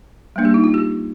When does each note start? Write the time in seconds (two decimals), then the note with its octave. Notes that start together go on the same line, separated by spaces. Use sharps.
0.36 G3 A#3 D4
0.45 G4
0.54 D#4
0.64 F4
0.74 G4